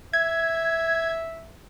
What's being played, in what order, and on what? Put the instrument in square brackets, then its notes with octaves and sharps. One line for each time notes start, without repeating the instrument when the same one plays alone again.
[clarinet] E5 [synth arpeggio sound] G#6